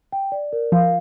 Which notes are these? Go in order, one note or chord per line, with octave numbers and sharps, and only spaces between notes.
G5
D5
A#4
F3 F5